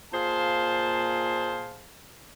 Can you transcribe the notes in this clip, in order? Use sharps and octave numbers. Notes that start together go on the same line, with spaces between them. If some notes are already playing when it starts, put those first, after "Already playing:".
A#2 G#4 C5 F5 A5